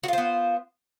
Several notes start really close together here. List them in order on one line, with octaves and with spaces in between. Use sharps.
F#4 F4 C5 B3